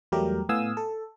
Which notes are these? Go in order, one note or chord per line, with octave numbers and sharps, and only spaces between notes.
E2 F#3 G3 A3 G4 A#4
A2 B3 F5 G#5 D#6 E6
A4